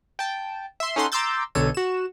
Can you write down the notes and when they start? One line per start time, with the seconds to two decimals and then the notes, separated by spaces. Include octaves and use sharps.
0.19 G5 A5
0.80 E5 C6
0.96 C#4 D#4 A4 F#5 C6
1.12 A#5 C6 D6 E6 G6 A6
1.55 B1 D3 A4 C#5 D#7
1.75 F#4 E7